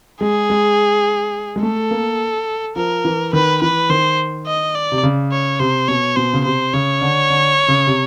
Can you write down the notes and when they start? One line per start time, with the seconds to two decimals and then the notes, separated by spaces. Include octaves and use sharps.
0.21 G#3 G#4
0.50 G#3
1.56 G#3
1.63 A3 A4
1.91 A#3
2.76 F3 A#4
3.05 E3
3.33 D#3 B4
3.62 E3 B4
3.90 D#3 C5
4.46 D#5
4.75 D5
4.92 C3
5.03 C#3
5.32 C#5
5.59 C3 C5
5.88 B2 C#5
6.16 B2 C5
6.33 C#3
6.44 C3 C5
6.73 C#3 C#5
7.01 D3
7.30 D3
7.68 C#3
7.87 C3